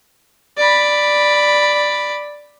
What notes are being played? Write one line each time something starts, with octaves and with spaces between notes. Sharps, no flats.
D5 B5